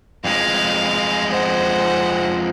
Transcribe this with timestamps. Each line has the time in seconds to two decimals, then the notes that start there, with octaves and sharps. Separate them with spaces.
0.24 F2 G#3 F5
1.32 C5 F#5